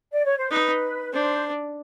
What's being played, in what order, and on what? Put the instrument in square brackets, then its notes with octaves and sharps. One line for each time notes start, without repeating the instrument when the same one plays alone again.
[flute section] D5
C#5
C5
[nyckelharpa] D#4 [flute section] B4
[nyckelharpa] D4 [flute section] C5